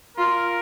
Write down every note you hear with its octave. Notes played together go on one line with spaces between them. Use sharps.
F4 A#4